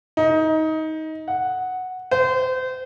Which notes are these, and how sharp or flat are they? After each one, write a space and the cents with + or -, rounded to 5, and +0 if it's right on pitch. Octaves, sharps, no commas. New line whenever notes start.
D#4 +20
F#5 -5
C5 -30